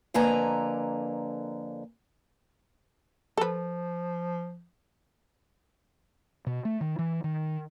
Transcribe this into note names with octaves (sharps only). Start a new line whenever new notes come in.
F2 D3 A#3 B4 G#5 A#5
F3 A4 B4
B2
A3
D#3
E3
D#3